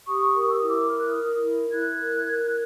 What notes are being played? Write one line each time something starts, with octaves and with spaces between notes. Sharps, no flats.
G4 C#6 D#6
A#4
E6
E4 D#6
D6 E6
A#4 F6
F#6
D#6 F6
A#4
E4
E4 F#6 G#6
A#4
A#4
F#6